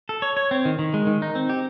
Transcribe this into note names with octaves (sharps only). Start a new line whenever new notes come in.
A4
C#5
C#5
C4
D#3
D#3
G#3
D#3
D#4
C4
G4